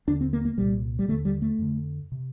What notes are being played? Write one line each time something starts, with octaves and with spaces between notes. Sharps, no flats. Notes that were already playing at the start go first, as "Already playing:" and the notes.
D#2 D3 D4
C4
A#3
A#3
C2 A#2 G3
G3
D#2 D3 A3
G3
A3
F2 D3
C3